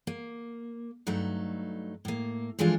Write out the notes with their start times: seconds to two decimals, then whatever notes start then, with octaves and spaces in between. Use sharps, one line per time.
0.07 A#3
1.07 G2 F#3 A3 D#4
2.05 A2 A#3
2.59 E3 F3 G#3 A3 D4 F4